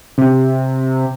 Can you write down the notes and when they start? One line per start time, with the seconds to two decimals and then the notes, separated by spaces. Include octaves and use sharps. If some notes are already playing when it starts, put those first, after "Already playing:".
0.18 C3